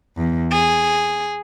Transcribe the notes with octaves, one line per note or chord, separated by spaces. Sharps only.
E2
G#4